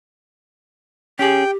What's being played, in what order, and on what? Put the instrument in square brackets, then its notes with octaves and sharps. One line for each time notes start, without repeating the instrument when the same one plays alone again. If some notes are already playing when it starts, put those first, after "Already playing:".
[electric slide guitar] C#4 G#4 [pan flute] G4 [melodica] G5